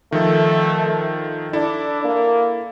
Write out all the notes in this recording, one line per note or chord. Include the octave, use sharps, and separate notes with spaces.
D#3 F3 A3 A4
D4 E4 A4
A#3